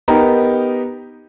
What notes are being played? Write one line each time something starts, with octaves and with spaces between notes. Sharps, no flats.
B3 D#4 G4 A#4